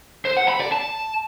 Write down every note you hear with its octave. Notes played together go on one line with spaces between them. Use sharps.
C5
F#5
B5
D5
A5